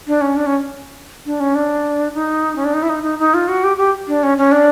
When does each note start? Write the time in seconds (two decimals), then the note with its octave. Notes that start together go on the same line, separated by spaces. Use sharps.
0.07 D4
0.21 C#4
0.37 D4
0.46 C#4
1.26 D4
1.40 C#4
1.55 D4
2.14 D#4
2.56 C#4
2.65 D4
2.74 D#4
2.83 E4
2.89 D#4
3.03 D#4
3.19 D#4
3.34 F4
3.49 F#4
3.64 G4
3.77 G4
4.08 D4
4.23 C#4
4.38 C#4
4.52 D4